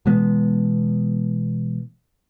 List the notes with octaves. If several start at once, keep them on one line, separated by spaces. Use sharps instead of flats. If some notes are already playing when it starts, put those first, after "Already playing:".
B2 E3 G#3 B3